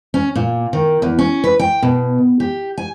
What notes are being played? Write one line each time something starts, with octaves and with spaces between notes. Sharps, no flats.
C#4
A#2
D#3
E2
C#4
B4
G5
B2
G4
G#5